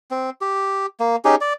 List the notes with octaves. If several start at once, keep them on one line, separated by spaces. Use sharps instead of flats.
C4
G4
A#3
C#4 D#4 G4 G#4
D5